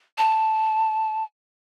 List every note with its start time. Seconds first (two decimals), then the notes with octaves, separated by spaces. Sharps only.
0.18 A5